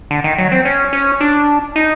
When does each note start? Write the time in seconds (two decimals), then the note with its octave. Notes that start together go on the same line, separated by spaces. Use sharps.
0.11 D3
0.24 D#3
0.38 F#3
0.52 C4
0.65 C#4
0.93 C#4
1.20 D4
1.76 D#4